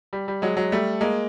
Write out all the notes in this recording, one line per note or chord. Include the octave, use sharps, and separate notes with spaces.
G3
G3
F#3 G#3
F#3 G#3
G3 A3
G#3 A#3